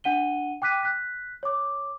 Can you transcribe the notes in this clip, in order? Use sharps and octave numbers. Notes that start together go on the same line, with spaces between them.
D4 F#5 D#7 G7
G5 D6 F#6 B6 D#7
F#6 B6
C#5 D6